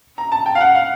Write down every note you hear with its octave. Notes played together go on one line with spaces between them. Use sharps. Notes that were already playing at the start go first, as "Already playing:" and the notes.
A#5
A5
G5
F5
F#5
F5